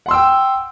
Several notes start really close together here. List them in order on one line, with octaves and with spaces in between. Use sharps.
F#5 C6 E6 G5